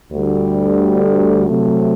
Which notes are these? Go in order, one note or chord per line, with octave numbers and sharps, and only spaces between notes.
D2 D3 G3
C3 F#3 A3